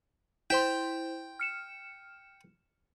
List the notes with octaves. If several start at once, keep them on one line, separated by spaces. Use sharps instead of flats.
E4 C5 G5 C6
F6 C#7 E7